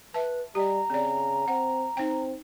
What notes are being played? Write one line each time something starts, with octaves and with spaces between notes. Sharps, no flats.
B4 E5 A5
G3 G4 D#5 A#5
C#3 C4 D5
C4 F#5
C4 D#4 G5